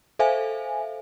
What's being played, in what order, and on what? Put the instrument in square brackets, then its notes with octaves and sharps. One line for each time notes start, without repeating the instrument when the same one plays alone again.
[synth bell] A4 C5 E5 F5 G#5